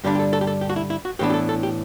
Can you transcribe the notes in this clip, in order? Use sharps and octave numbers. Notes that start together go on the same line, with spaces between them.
G2 D3 G3 D4 G4
G4
A4
A4
G4
A4
G4
F#4
E4
E4
F#4
A2 E3 B3 D4 G4
G4
A4
A4
G4